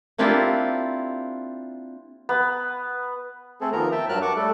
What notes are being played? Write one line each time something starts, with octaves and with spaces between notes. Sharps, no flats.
A#3 C4 D4 E4 F4 G4
B3
A3 C4 G#4 A4
D#2 F3 B3 A#4 A#5
E5 G5 A5
G2 F#3 A#4 A5 F6 F#6
F#5 A5 C#6 D6
G3 A3 A4